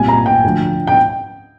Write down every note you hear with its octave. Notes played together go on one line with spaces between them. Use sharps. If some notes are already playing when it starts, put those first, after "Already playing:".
Already playing: C2 A#2 G3 G#5
A#5
G5
D2 D3 F3
G5